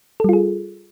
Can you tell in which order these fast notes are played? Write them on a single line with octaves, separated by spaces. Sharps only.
A4 G3 F4 G#4